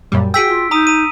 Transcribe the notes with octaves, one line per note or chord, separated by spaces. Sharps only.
F#2 A#2 G3
F#4 G#4 G5 E6 B6 D7
F4
D#4 A#5 D#6 D#7
A#5 D#7